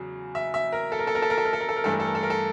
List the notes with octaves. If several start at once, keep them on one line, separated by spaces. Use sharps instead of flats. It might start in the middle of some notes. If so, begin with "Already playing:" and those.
Already playing: E2 C#3 F#3
E5
E5
A#4
A4
A#4
A4
A#4
A4
A#4
A4
A#4
A4
A#4
A4
A#4
G2 E3 A3 A4
A#4
A4
A#4
A4
A#4
A4